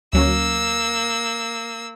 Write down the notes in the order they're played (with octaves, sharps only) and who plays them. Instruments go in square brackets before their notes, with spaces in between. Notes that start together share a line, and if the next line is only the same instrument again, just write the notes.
[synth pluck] D2 F#3 C#4 [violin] A#3 E6